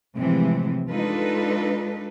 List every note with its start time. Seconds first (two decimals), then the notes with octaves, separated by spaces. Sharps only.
0.17 A2 C3 E3 F3 G#3 C4
0.91 G#3 D4 D#4 F4 A4 B4